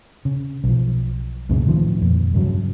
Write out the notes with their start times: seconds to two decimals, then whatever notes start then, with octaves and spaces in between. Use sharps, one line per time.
0.25 C#3
0.64 B1 F3
1.49 C#2 F#2 A#2 C#3
1.64 A2 D#3 F3
2.01 F2 A#2
2.34 G2 C#3 F3 F#3